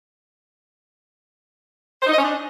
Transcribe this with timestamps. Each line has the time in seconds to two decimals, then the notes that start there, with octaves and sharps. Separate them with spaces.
2.02 C5
2.07 D#4
2.12 D#5
2.17 C#4
2.23 D4